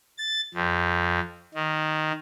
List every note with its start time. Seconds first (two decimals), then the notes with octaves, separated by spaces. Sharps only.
0.18 A6
0.54 F2
1.54 D#3